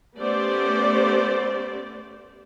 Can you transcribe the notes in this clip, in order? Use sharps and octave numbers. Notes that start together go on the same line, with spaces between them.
A3 B3 C#4 G4 C5 D5